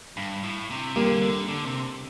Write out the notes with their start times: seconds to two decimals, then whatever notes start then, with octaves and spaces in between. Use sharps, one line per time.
0.17 G2
0.43 A2
0.70 C3
0.96 D3 G3 A#3
1.22 D3
1.48 D3
1.65 C3